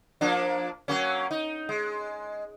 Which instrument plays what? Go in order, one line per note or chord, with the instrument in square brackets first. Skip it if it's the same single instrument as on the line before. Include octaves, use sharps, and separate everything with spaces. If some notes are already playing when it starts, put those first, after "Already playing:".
[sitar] F3 A#3 D4
F#3 A#3 C#4
D#4
G#3